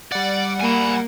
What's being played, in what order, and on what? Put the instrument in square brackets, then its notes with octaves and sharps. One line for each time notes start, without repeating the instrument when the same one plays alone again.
[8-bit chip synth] G3 F#5 [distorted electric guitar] D5
[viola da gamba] A#3 [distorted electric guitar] G#5 B5